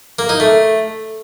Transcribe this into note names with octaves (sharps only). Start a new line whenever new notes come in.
A#3
D#4
A3